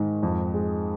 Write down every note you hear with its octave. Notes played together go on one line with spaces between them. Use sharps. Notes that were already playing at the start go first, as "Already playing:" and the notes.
Already playing: G#2 D#3
F2
G#3